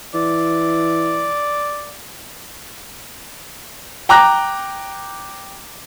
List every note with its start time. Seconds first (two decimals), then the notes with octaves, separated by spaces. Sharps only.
0.15 E3 D5
4.09 G5 A#5 D6 F#6 A#6